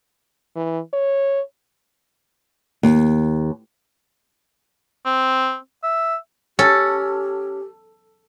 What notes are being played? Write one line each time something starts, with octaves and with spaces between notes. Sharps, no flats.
E3
C#5
D#2
C4
E5
C#4 G4 A4